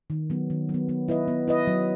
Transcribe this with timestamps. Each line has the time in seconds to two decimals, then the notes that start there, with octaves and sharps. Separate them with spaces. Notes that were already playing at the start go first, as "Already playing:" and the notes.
0.10 D#3
0.30 F#3 B3
0.50 D#3
0.69 F#3 B3
0.89 B3
1.08 E4 B4 D#5
1.28 B3
1.48 E4 B4 D#5
1.67 F#3